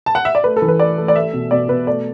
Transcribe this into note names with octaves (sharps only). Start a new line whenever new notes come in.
A5
F#5
E5
D5
A3 B4
A4
E3
B4
A3 D5
A3
D5
A3 E5
B2
B2 D5
B2 B4
A3 D5